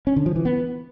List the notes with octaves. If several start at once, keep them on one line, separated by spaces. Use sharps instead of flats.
C#4
D3
F3
E3
B3